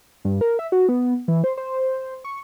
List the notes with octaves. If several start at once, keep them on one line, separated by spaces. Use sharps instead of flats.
G2
A#4
E5
F#4
B3
E3
C5
C5
C#6